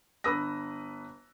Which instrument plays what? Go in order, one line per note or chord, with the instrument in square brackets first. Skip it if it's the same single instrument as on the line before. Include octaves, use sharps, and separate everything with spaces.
[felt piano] G1 B4 D#6 E6 A#6